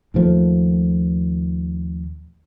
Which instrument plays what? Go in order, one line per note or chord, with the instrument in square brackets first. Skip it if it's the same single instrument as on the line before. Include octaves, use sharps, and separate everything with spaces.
[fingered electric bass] D#2 A#2 F3 A3